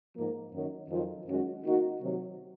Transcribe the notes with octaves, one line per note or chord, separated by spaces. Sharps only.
G#2 F3 A#3
F#2 D#3 F#3
F2 D#3 F#3 C4 F4
F#2 D#3 G#3 C#4 F#4
D#3 A#3 D#4 F#4
C3 D#3 F#3